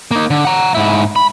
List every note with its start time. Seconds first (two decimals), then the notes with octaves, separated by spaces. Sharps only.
0.11 A#3 D#4
0.30 D3
0.45 F#5 A#5
0.75 G#2 E4
1.16 B5